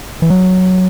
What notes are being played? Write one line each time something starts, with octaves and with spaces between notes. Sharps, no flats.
E3
F#3